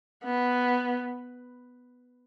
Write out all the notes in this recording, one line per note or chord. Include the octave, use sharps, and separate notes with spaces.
B3